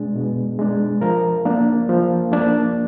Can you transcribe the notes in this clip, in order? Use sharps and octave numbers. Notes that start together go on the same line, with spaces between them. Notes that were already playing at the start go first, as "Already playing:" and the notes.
Already playing: B2 G#3 D4 G#4
B2
G#3 D4
F3 A#4
A#3 D4
F3
A#3 D4